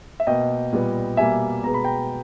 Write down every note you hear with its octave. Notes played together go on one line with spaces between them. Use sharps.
E5
B2 A#3 D#5 G5
A#2 G3 B3
B2 G3 A#3 E5 G#5
B2 G#3 B3 A#5
B5
G5 A#5